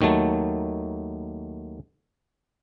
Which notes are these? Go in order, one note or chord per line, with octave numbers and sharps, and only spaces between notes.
D#2 D#3 F#3 A3 A5